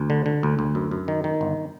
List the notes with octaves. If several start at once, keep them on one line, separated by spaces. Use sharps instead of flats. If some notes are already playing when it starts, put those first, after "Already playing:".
Already playing: D2
D3
D3
D2
D2
F#2
F#2
D#3
D#3
G1